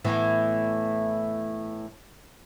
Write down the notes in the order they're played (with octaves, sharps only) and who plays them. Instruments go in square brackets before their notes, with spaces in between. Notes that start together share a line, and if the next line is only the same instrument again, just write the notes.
[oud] A2 E3 B3